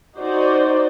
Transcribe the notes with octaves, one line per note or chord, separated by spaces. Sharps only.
D#4 F#4 C5 D5